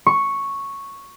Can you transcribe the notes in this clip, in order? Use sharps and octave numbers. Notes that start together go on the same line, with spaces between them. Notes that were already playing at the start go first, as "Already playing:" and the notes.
C#6